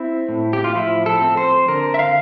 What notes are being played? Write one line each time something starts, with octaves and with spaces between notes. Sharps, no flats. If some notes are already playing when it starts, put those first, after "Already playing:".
Already playing: C4 E4
A2
G4
F4
F3 E4
A4
C4
C5
D3 A#4
E5
F5